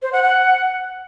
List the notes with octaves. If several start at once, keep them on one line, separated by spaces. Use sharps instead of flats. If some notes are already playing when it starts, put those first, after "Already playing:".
C5
F#5
F#5